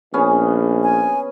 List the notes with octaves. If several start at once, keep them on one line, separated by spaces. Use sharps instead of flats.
A#1 B3 C#4 G#4
G#5